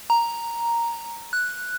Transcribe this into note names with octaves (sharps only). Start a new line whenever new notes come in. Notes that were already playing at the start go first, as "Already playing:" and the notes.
A#5
F#6